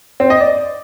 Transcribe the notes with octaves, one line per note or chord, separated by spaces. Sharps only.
C4
D#5
D5